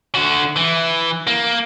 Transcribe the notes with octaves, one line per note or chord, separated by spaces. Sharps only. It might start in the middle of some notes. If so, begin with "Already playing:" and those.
D3 F#4
E3
A#3